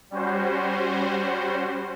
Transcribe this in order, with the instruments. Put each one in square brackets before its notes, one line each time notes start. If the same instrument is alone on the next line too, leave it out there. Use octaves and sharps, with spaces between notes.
[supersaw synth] G3 C#4 F#4 C5